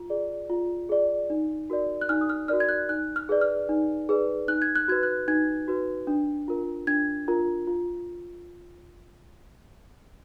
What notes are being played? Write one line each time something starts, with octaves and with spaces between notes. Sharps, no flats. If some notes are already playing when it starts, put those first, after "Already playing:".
Already playing: F4
G#4 D5
F4
G#4 D5
D#4
F#4 A#4 D5
F#6
D#4 F6
D#6
F6
F#4 A#4 D5 F6
G#6
F#6
D#4 F#6
F6
G#4 B4 D5
F6
D#4
G#4 B4 D5
D#4 F#6
G#6
F#6
F#4 B4 G#6
F#6
D#4 G#6
F#4 B4
D4
F4 A#4
D4 G#6
F4 A#4
F4